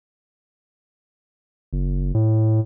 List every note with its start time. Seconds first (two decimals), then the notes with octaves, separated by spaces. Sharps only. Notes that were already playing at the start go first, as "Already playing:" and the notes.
1.73 F#1
2.15 A2